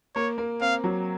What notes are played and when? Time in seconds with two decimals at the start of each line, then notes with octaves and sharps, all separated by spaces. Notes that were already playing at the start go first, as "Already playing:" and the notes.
0.15 A#3 C#5
0.38 A#3
0.61 C4 F5
0.84 F#3